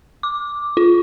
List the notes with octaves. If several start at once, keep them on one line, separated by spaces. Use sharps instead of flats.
D6
F4